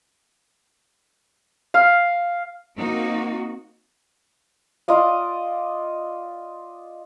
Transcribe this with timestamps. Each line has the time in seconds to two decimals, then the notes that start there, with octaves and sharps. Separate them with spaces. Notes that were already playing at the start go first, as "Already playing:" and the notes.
1.74 F5
2.77 A#3 C4 D#4 F#4
4.88 F4 D5 D#5 F5